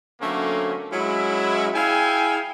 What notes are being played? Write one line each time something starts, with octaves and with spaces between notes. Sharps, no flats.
D3 F#3 A3 A#3 C4 C#4
F#3 G#3 C#4 E4
E4 G#4 F5 G5 G#5